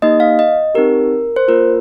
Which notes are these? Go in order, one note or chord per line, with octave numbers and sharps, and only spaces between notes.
A#3 D#4 G4 D#5
F5
D#5
C4 D#4 G4 A#4
C5
A#3 F4 A#4